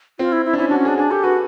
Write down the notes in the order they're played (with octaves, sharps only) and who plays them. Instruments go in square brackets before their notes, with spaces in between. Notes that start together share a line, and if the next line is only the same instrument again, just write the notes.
[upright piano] C4 [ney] F4
[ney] E4
E4
[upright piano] D4
[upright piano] C#4 [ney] E4
[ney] D4 [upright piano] F#4
[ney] C#4
[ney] D4 [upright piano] G#4
[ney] D4 [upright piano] G#4
[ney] G4 [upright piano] A4
[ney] F#4 [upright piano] B4